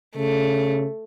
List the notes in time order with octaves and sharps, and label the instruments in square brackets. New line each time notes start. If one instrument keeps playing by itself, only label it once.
[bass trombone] C#3 [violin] A3